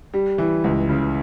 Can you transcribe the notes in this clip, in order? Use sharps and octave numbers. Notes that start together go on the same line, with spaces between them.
G3
E3
C#2
C#3